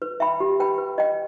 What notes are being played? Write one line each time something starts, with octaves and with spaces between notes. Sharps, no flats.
B4
E5 G5 B5
G4
B4 G5 B5
B4
D#5 G5